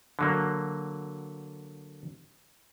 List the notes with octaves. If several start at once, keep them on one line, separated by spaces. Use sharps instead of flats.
D3 F#3 A#3